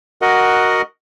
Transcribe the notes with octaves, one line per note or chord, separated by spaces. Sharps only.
F#4 A#4 D#5 F#5